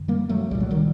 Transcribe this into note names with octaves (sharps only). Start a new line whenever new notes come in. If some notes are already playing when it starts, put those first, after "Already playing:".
Already playing: F#2 D3
G3 A#3
F#3 A3
C2 A#2 G3
F#3
D#3 G3